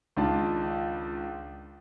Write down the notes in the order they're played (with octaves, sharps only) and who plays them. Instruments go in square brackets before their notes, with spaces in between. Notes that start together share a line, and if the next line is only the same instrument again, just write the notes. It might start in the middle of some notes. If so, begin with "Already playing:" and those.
[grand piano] C#2 D#3 D4 F4 A5